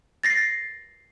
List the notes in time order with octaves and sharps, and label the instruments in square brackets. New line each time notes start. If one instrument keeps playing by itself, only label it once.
[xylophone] A6 A#6 C7